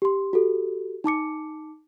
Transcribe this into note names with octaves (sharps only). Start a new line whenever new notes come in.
G4 C6
F#4 G4 A4
D#4 A5 D6 C#7